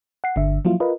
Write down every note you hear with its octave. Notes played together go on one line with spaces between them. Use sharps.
F#5 C7
G1 D3 E5
F3 F#3 A#3 E4 F4
F4 A#4 B4 D#5